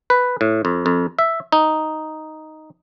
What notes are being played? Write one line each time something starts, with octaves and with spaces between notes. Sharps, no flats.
B4
A2
F2
F2
E5
D#4